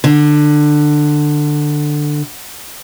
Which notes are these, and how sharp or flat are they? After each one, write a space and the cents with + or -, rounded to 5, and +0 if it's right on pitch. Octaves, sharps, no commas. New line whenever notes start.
D3 +15